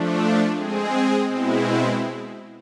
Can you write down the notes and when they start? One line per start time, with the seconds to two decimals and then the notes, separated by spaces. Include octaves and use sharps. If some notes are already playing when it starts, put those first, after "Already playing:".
Already playing: F3 A3 D4
0.55 G#3 C4 G#4
1.29 B2 G#3 C4 E4